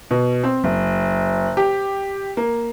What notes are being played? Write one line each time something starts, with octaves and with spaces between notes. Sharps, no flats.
B2
C4
F#1
G4
A#3